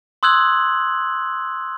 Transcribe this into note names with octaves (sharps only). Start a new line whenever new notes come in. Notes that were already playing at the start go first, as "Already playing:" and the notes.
C6 D#6 E6 F#6 G#6 F#7